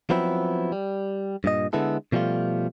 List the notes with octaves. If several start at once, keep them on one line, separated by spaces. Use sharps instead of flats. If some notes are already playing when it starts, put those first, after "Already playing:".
F3 F#3 B3 C4 E4
G3
G2 A#2 D#5
D3 G#3 B3 E4 A4
B2 F3 G3 A3 F4